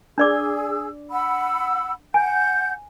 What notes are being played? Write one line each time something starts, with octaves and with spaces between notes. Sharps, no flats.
D4 G#4 D5 D6 E6
F#5 B5 E6
F#5 G#5 G6